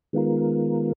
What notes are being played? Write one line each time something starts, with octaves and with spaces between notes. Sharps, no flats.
D#3 G#3 B3 F4 A#4